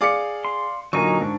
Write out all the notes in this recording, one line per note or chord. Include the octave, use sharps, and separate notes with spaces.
G#4 D5 F5 D6 C#7
C6
A#2 D3 F#3 D#4 A#4 G#5 C#6
G#2 D4